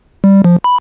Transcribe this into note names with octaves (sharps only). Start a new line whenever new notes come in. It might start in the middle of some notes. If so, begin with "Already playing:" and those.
G3
F3
B5